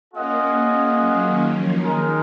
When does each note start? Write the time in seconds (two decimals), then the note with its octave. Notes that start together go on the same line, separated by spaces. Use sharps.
0.13 A#3 C#4 F4 G#4 D#5 F#5
0.98 F#3 A#3
1.27 D#3
1.56 F3
1.84 D#3 G#3 D#4 A#4